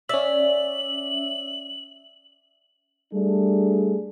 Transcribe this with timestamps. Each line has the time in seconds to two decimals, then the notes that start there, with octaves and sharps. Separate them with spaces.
0.09 C#4 D5 E5 F#7
3.12 G3 A3 D4 G#4